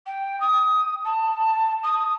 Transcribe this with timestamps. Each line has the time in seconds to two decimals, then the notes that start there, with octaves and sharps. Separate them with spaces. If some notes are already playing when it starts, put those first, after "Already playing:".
0.06 G5
0.40 D#6
1.04 A5
1.83 D#6